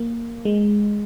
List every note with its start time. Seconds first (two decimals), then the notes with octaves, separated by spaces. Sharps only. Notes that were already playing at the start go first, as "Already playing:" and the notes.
Already playing: A#3
0.45 G#3